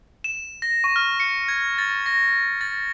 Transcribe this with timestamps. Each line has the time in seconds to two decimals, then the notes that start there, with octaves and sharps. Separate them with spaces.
0.24 E7
0.62 A#6
0.84 C#6
0.96 F6
1.20 C#7
1.48 G#6
1.78 A6
2.06 A#6
2.61 A6